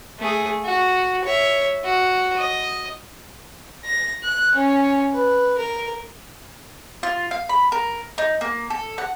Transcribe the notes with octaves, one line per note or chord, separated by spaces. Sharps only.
A3 G#4
F#4
C#5 E5
F#4
D#5
A#6
F#6
C#4
B4
A#4
F4
F5
B5
A#4
D#4
A#3
A4
F#5